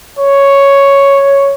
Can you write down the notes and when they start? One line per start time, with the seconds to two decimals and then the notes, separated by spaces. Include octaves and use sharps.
0.19 C#5